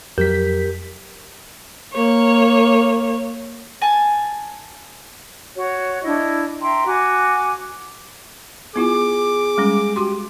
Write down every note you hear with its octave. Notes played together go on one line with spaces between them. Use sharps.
F2 F#3 G4 A#4 G6 B6
A#3 C#5
G#5 A5
F#4 C#5
D4 E4 D#5
E5 G5 A#5 C6
F#4 G#5 D6
B3 E4 F4 G#4 D6
G3 G#3 C#4
F#4 G4 C6